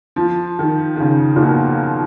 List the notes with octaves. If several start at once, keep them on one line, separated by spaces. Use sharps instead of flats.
F3
D#3
D#3
C#3
A#2
B2